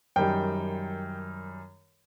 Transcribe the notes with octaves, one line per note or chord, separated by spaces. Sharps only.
F#2 D#3 G3 G5